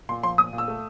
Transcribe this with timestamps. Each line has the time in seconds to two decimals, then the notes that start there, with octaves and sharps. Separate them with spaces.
0.09 A#2 C6
0.23 F3 C6
0.38 A#2 D#6
0.53 A#2
0.58 E6
0.68 A3